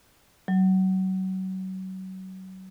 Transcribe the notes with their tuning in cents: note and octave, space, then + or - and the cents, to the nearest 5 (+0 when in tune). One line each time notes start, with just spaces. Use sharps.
F#3 +30